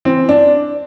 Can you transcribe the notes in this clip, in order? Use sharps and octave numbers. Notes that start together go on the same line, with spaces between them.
E3 C4
D4